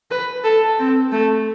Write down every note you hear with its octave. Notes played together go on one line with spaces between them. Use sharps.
B4
A4
C4
A3